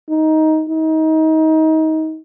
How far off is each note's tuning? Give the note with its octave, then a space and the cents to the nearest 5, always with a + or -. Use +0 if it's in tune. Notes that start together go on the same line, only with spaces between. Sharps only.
D#4 +10
D#4 +25